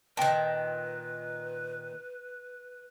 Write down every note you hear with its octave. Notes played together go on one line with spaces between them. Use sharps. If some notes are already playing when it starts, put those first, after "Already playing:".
A#2 D#3 B4 G5 A5